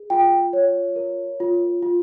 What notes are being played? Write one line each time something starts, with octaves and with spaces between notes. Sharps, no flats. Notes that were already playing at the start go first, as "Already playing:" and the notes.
Already playing: G#4
F4 G5
C#5
A#4
F4
F4